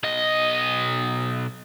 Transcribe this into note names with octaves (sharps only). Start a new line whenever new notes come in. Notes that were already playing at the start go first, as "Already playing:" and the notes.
B1 D#5